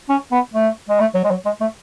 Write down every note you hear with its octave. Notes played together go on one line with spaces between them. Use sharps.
C#4
B3
A3
G#3
A3
F#3
G#3
F#3
G#3
A3